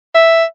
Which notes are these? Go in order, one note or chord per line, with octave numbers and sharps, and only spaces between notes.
E5